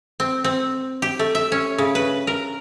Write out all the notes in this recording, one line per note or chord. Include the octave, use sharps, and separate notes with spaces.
C4
C4
G4
A3
E5
C#4
C#3
B4
A#4